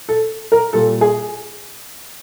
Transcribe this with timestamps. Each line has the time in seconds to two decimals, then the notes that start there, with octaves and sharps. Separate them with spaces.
0.09 A4
0.52 A#4
0.73 A#2 G3 A4
1.01 G#4